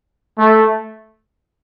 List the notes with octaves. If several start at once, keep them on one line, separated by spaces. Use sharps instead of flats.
A3